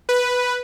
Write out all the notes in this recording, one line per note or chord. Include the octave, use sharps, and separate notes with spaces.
B4